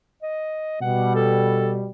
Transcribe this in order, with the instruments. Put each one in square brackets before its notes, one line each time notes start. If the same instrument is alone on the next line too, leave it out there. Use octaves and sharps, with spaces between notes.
[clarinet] D#5
[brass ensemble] B2 G3 [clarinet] F#5
[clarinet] A4